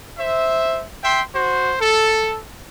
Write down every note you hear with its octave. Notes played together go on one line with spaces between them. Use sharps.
C5 E5
E5 G5 C6
F#4 C5
A4